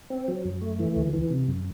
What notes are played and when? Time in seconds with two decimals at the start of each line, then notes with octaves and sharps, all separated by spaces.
0.10 C4
0.28 F#3
0.45 F#2
0.62 A3
0.79 E3
0.96 D2
1.13 E3
1.30 C3
1.48 F#2